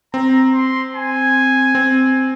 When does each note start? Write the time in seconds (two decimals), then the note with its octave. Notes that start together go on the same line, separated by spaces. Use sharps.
0.14 C4 A#5
0.54 C6
0.95 G#5
1.75 C4